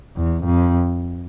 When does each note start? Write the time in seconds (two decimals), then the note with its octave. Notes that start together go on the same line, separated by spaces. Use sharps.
0.17 E2
0.45 F2